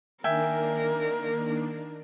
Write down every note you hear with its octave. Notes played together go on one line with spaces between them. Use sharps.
D#3 A#3 D4 A#4 E5 G5 G#5